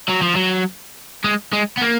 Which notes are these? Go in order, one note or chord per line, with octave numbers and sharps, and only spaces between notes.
F#3
F3
F#3
G#3
G#3
B3
A#3